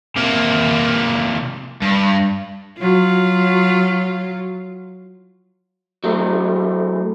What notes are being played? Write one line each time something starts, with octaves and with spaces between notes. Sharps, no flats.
C3 A#3
G2
F#3 F4
F#3 G#3 A3 C4